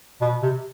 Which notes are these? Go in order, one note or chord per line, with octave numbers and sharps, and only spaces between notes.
B2
C3